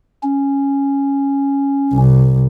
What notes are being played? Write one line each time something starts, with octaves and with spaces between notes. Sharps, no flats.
C#4
C2